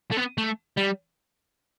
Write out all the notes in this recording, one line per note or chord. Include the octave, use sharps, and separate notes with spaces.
A3
B3
A3
G3